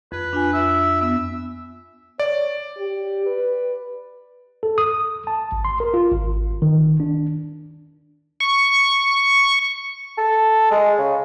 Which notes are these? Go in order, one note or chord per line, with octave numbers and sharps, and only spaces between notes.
F2 B4
D4 F4 G#5
E5
B3 E5
C#5 D5
G4
B4
A4
D#6
A5
G#1
C6
A#4
F4
G#1
D#3
D4
C#6
A4
G#3
C#3